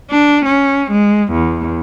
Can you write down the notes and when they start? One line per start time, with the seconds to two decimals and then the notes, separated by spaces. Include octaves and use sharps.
0.10 D4
0.45 C#4
0.91 G#3
1.32 E2